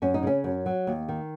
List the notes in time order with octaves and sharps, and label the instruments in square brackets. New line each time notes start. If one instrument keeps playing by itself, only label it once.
[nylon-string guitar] F#2 C#4
D#4
C#3 C#4
F#2
F#3
D#2
D#3